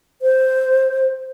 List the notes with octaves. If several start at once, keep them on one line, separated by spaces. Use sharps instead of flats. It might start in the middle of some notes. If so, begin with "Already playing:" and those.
C5